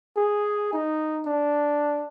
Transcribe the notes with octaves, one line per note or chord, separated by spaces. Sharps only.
G#4
D#4
D4